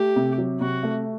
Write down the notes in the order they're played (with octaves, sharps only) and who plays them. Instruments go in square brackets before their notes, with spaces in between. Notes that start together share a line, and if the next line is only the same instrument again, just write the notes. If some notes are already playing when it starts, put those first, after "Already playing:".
Already playing: [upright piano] A3 [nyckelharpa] G4
[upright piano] C3
F#3
[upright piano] C3 [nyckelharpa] F#4
[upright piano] A3